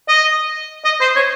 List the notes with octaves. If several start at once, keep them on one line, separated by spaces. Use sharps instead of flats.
D#5
D#5
C5
C#5